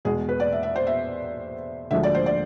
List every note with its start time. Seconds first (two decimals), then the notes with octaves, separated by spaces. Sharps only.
0.05 E2 B2 G#3 G#4
0.29 B4
0.40 D5
0.52 E5
0.63 E5
0.76 C5
0.87 E5
1.91 D2 D3 F3 G#3 E5
2.03 D5
2.15 C5
2.26 D5